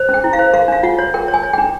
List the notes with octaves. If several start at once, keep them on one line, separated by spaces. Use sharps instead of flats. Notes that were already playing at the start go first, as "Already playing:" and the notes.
Already playing: C5
C#4
G5
E4
F5
C5
A#4 F5
D4 F5
F4 F#5
C#5
A#4 G5
C#5
G#5
C#5
G5
D4